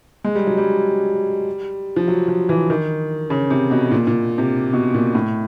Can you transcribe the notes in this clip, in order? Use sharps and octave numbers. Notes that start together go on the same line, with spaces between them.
G#3
G3
F#3
G3
F3
F#3
F3
E3
D#3
C#3
C3
B2
A#2
A#2
C3
B2
A#2
A2